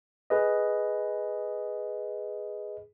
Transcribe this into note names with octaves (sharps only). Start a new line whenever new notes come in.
G#4 B4 D#5